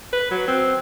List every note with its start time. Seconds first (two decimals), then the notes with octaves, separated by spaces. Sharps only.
0.13 B4
0.31 F#3
0.48 C4